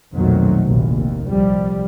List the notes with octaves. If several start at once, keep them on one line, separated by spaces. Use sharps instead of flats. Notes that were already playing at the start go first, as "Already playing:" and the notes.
B1 F2 A#2 D#3 F#3 A3
F1 A#1 D#2
D#2
C2 F3 G3